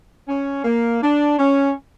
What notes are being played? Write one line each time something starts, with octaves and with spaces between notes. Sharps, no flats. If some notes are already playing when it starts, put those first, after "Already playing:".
C#4
A#3
D4
C#4